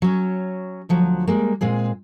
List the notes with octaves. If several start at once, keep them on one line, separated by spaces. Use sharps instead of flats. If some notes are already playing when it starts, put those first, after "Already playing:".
F#3 C#4
D2 F3 F#3
G3 G#3 A#3
A#2 G#3 C4 G#4